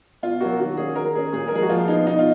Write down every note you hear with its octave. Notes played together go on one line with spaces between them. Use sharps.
B2 F4
F#3 A#3 F#4
D#3 F#4
A#3 C#4 G#4
D#3 A#4
A#3 C#4 G#4
A#2 G#4
A#4
F3 G#3 G#4
F#4
F3 F4
B3 D#4
B2 D#4
F4